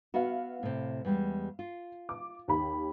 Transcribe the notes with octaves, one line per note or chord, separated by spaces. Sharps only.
B3 F#4 B4 E5 F5
A2 C3
E2 G3 G#3
F4
D6
D#2 G4 B5